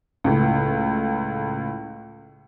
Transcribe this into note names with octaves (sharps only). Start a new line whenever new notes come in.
C#2 A2